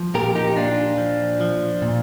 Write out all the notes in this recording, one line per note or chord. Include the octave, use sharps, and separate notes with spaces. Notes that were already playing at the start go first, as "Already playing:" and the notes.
Already playing: F3
A#2 G4 A#4
D#4 G4
D#4
A#2 D4 F4
F3
F3
A#2